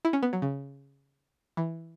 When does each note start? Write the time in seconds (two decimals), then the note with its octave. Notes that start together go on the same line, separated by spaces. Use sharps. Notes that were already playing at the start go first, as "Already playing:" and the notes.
0.05 E4
0.13 C#4
0.23 B3
0.33 F#3
0.42 C#3
1.57 E3